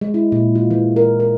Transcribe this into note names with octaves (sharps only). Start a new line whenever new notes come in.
G#3
E4
A#2
F4
E3
A#4
A#4